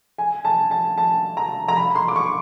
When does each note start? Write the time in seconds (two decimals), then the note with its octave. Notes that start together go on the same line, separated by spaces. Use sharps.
0.18 G#5
0.45 A5
0.71 A5
0.98 A5
1.37 A#5
1.68 A#5
1.76 B5
1.95 C6
2.08 D6
2.16 C#6